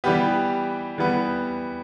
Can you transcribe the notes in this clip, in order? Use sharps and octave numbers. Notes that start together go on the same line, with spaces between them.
E3 G3 B3 G4
E3 G3 B3